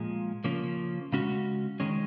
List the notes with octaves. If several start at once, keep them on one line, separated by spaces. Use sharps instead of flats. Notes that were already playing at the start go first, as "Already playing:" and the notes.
Already playing: A#2 F3 G#3
C#3 F3 A#3 C#4
C#3 G#3 C#4 F#4
D#3 G#3 C#4